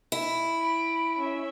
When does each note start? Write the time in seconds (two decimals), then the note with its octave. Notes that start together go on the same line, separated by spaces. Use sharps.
0.12 E4
0.61 B5 D7
1.18 C#4 E5